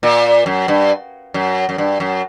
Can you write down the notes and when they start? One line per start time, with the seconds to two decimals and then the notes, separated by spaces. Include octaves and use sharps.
0.03 A#2
0.46 F#2
0.68 G2
1.34 F#2
1.69 F#2
1.78 G2
2.00 F#2